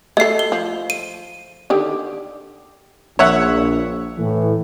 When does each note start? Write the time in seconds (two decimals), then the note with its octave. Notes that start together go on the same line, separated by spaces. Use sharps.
0.17 A3 A4 D#5 C7
0.39 G7
0.52 F3
0.90 D#7
1.70 D3 D#3 G4
3.19 A#1 C#5 E5 F#5
4.18 A2 E3